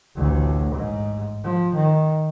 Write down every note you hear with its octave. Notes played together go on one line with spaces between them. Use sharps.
A1 D2
G#2
F3
D#3